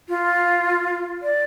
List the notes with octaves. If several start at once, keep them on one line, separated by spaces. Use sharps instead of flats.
F4
D5